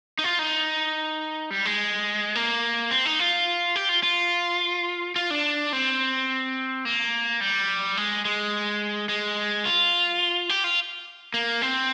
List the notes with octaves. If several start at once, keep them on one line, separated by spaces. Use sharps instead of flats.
D#4
F4
D#4
G3
G#3
A#3
C4
D#4
F4
G4
F4
F4
F4
D4
C4
A#3
G3
G#3
G#3
G#3
F4
G4
F4
A#3
C4